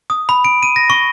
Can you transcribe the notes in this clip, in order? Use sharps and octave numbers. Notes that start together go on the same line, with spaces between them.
D#6
B5
D7
D#7
A#6
C#6